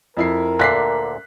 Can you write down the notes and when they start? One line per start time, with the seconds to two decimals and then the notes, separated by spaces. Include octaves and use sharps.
0.17 F2 E4 A#4 C7
0.59 D2 A#2 D3 F#6 B6 C7